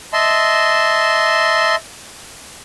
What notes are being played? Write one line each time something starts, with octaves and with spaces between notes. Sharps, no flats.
D#5 E5 A5 C6